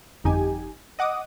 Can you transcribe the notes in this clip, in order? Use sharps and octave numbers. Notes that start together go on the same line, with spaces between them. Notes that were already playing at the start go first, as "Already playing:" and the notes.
G1 F2 D#4 G4 G#5
D#5 F#5 D6 D#6